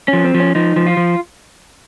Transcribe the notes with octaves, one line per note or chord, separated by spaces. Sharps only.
F3 C#4
C4
F3
C#4
F3 D#4
F3
F4
F3